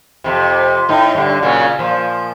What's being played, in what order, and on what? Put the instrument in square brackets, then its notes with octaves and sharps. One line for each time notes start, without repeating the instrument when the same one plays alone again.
[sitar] F2 C3
A2 D#4
G2 D3
A#2 C#3 F#3
A#2 F3